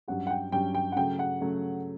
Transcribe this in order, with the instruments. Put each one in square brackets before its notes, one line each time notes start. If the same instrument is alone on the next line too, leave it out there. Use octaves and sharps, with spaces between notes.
[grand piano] G2 F#3 C#4 G4 [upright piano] F#5
[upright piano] F#5
G5
[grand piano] G2 F#3 C#4 G4 [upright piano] G5
[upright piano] G5
F#5
[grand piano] C#3 F#3 A3 [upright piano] G5
[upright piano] F#5
[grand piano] C#3 F#3 A3